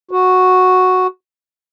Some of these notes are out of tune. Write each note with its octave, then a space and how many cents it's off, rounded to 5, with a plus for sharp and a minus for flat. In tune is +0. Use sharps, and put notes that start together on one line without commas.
F#4 -5